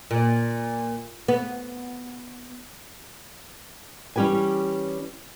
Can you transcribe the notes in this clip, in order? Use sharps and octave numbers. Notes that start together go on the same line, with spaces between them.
A#2
B3
E3 G3 C#4 G4 B4 G#5